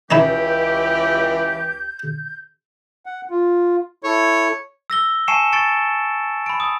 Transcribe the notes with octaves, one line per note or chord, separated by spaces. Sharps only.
C#2 E3 C#4 D#4 E4 G4 G6
F#5
F4
E4 A4 C#5
E6 A#6 G7
G#5 A5 C#6 C7 C#7 E7
C#6 A6 C#7 D7
B5 D7
D#6